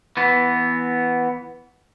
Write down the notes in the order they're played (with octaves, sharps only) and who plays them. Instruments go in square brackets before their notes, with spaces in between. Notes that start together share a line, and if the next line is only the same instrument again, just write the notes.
[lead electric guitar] E3 B3